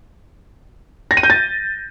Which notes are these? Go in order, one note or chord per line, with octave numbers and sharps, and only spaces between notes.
A#6
D#7
G6
A6